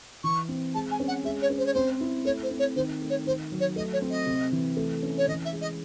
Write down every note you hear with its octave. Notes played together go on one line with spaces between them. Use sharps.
E3 C#6
C4
G#3 A5
G#5
C#4
F#5
G#3 E5
C#5
C#4
C5
C#5
C4 C5
E4
A3 C#5
C5
C4
C#5
D#3 C5
A3
C#5
D#3 C5
F#3
C#5
A3 D#5
C#5
C4
D#5
C3
E3
A3
C#4
C#5
E3 D#5
E5
G#3
D#5